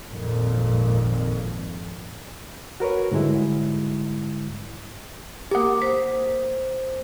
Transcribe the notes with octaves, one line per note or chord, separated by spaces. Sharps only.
G#1 F2 A#2
F#4 A#4 B4 C#5
G#2 D3 G3 G#3 E4
A#3 G4 A#4 F#5 D6 D#6
C5 B6